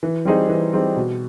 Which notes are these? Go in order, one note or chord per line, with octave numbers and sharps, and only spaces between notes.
E3
G3 C4 D#4 G#4
E3
G3 C4 D#4 G#4
B2